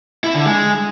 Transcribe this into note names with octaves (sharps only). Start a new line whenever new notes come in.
E4
D3
G#3